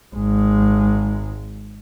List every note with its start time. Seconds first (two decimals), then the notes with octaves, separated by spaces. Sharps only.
0.15 G#1 G#3